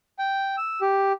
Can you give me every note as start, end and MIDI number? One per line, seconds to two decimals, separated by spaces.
0.19 0.56 79
0.57 0.81 88
0.81 1.12 67